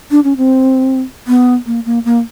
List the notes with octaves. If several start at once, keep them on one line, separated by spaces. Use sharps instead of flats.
D4
C#4
C4
B3
A#3
A#3
A#3